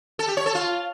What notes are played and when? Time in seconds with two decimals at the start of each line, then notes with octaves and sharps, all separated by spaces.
0.19 A4
0.28 G4
0.37 C#5
0.46 A4
0.55 F4